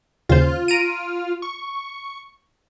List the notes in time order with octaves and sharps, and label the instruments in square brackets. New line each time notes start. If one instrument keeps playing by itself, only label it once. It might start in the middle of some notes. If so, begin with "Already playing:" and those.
[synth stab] D#2 C#3 C5 [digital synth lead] F4
[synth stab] A#5 D7 D#7
[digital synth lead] C#6